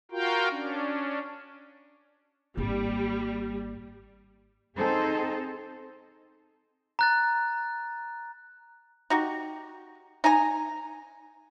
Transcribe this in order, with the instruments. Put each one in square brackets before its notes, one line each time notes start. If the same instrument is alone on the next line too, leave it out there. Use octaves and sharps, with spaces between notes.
[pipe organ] F4 F#4 A#4 F5 G5
C#4 D4
[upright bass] G#1 A#3 [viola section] G3
[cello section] C4 D#4 G#4 A4 C5
[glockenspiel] A#5 F#6 A6
[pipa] D#4 F#4 G4
D#4 G#5 A#5